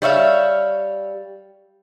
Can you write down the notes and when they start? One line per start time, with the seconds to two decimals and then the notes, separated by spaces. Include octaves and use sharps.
0.02 G3 C#5 E5 F5